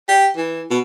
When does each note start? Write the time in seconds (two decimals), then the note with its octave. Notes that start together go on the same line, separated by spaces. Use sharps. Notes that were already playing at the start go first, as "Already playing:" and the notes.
0.09 G4
0.37 E3
0.71 B2